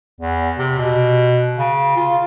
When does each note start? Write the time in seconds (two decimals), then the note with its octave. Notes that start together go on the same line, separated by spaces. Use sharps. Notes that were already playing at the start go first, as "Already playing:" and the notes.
0.20 E2
0.58 C3
0.78 B2
1.58 C#3
1.96 F4